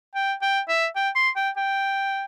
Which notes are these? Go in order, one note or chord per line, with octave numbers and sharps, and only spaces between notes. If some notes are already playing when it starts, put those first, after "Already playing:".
G5
G5
E5
G5
C6
G5
G5